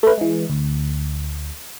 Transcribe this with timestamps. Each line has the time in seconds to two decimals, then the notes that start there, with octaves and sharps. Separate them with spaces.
0.03 A3 B4
0.18 E3 G#3
0.50 D2